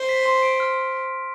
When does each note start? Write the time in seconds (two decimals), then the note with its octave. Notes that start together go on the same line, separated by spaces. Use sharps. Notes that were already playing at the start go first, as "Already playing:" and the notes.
Already playing: C5
0.09 B6
0.25 C6
0.42 D7
0.60 F6